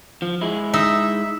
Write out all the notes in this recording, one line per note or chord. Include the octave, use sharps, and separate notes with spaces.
F3
G#3 E4
D#4 E5